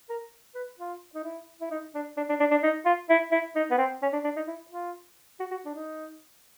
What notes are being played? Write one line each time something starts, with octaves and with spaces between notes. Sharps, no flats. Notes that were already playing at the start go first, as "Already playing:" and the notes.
A#4
B4
F4
D#4
E4
E4
D#4
D4
D4
D4
D4
D4
D#4
F4
E4
E4
D#4
B3
C4
C#4
D4
D4
D#4
E4
F4
F#4
F#4
D4
D#4